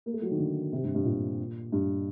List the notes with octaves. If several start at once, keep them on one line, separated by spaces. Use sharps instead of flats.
A#3
A3
F#3
D#3
D3
C3
G2
G2
A#2
G2